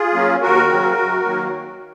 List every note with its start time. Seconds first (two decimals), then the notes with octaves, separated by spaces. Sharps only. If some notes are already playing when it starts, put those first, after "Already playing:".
Already playing: F4 G#4
0.14 F#3 A#3 C#4
0.42 D#2 F#4 A#4
0.70 C#3 F#3 C4
0.98 F#2
1.25 D#3 F#3 A#3